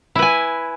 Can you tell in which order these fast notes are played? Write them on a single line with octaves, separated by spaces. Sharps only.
E4 B4 G#5